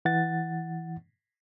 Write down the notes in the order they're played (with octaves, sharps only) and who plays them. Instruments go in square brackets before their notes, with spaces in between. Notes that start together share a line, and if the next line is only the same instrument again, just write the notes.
[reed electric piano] E3 F#5 A6